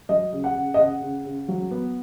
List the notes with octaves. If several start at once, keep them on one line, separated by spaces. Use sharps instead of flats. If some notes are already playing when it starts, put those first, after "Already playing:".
F#3 D#5
C#3
F#5
C#3
D#5
C#3 F#5
C#3
C#3
F#3
B3